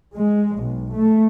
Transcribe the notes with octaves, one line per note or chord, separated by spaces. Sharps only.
G#3
B1
A3